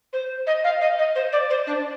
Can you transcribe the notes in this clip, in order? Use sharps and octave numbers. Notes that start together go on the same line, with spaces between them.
C5
D#5
F5
D#5
D#5
C5
D5
C5
D4